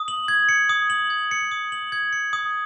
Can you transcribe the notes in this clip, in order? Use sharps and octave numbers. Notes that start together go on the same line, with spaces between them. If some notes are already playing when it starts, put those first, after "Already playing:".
Already playing: D#6
F#7
G#6
C#7
D#6
F#7
G#6
C#7
D#6
F#7
G#6
C#7
D#6